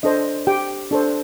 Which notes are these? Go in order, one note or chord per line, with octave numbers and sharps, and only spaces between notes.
D4 A4 C5 D#5
G4 G5
D4 A4 C5